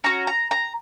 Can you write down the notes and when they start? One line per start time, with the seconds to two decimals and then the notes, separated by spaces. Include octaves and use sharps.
0.04 C#4 F#4 A#5
0.27 A#5
0.51 A#5